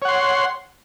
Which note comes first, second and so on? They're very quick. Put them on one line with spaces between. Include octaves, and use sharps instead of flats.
C#5 F#5 C6